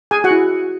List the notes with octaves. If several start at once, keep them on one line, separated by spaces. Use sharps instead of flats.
G#4 G#5
F#4 F#5
E4